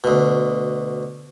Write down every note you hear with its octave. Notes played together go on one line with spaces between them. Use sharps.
D2 B2